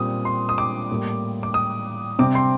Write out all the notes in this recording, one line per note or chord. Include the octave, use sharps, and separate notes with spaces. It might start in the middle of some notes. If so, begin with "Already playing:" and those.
Already playing: A#2 G3 C4 D#6
C6
D#6
D6
A2 G3 A#3
D6
D#6
C3 G3 C4 D6
C6